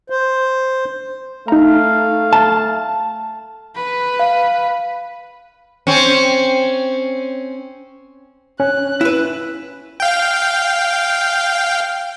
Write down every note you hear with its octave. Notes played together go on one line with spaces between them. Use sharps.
C5
A3 D#4 F5 A#5
A5
B4
F5
C4 C#4
C#4 F#6
E4 B4
F5 G5